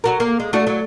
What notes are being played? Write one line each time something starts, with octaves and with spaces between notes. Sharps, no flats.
F#3 F#4 A#4
A#3
G#3
A3 D4 F#4
F#3